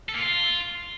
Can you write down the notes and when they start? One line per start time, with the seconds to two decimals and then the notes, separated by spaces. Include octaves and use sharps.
0.09 A4
0.14 A#3
0.19 F4